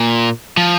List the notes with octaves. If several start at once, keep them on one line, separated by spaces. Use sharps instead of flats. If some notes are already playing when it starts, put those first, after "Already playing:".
Already playing: A#2
F3